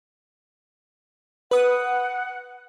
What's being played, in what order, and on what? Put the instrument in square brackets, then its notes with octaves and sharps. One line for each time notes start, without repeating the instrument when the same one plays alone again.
[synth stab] B4 D#6 [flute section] F#5